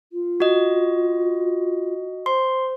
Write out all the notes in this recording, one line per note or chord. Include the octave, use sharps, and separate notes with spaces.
F4
F#4 D#5
C5 C6